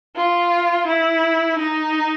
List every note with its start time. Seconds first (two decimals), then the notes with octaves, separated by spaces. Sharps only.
0.16 F4
0.87 E4
1.58 D#4